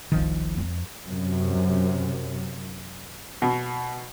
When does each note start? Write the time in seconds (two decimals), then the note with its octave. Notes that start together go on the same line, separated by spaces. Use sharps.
0.12 F#1 C2 D#3 F3
0.58 F2
1.08 F#2 C3
3.42 B2